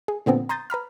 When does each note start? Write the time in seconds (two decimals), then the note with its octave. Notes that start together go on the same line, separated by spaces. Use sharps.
0.08 G#4
0.26 A#2 D3 F3 B3 C4
0.49 A#5 C6 D#6 G6 A6 A#6
0.70 B4 A#5 B5 F6